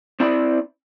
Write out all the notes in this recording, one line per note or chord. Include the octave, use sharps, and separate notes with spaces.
C4 E4 D5 B5